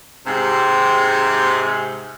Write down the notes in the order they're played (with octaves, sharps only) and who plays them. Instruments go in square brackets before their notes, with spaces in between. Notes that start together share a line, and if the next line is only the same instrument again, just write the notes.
[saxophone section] G#2 C3